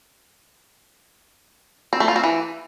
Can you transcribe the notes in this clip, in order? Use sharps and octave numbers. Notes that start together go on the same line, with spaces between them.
C4
A3
F4
C4
E3